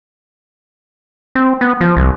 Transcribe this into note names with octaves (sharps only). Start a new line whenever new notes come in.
C4
B3
F3
C2